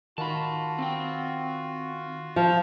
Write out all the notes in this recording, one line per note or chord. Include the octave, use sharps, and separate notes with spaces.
D#3 F4 F#4 A5 B5
C4 G5
F3